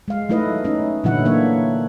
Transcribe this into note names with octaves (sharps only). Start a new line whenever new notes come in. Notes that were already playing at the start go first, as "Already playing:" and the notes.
G#3 F5
F#3 A3 D#4 E4 B4 D#5
C#4 D#4 E4
A#2 D3 E3 F#3 E4 F#5
A#3 D4 C#5 E5